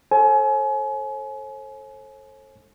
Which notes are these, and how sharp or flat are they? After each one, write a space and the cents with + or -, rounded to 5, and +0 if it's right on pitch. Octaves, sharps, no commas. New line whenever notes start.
A4 +0 C5 +45 G#5 +35